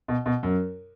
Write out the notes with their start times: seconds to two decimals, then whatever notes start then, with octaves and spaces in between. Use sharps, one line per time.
0.08 B2
0.26 B2
0.43 F#2